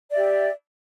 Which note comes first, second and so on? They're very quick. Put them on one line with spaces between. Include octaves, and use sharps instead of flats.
D5 E5 G4